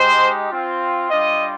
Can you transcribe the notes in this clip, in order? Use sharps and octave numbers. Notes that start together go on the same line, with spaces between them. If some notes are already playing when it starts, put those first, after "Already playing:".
Already playing: G#3 D#4 G4 C5
C4 F4
G3 D4 F4 D#5